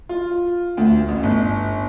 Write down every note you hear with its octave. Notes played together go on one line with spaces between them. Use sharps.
F4
D2
A1
G1